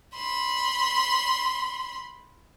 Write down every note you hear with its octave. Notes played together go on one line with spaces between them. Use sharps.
B5 C6